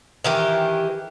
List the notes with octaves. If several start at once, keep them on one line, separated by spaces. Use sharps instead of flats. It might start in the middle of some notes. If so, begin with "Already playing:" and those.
D#3 E3 G4